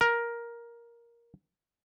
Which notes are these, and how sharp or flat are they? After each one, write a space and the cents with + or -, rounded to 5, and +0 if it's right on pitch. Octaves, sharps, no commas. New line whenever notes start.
A#4 +10